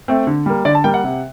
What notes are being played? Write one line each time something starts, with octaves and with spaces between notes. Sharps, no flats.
A3 C4
D3
G3 A#3
D3 D5
A5
G3 A#3 G5
F#5
C3